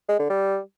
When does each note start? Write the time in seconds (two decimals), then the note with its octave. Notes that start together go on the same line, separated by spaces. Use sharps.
0.09 G#3
0.19 D3
0.30 G3